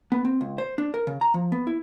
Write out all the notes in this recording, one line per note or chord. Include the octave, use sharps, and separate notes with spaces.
B3
C4
C#2
C5
D4
A#4
C#3
A#5
F3
B3
E4